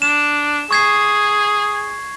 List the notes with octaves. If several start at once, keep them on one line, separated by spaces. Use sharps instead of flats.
D4 E7
G#4 C#6 G#6 C7